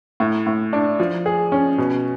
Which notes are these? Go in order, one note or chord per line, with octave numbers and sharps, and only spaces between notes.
A2
A2
D4
F3
G#4
C#4
B2